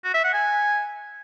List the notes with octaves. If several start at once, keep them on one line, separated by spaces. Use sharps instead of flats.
F#4
E5
F#5
G#5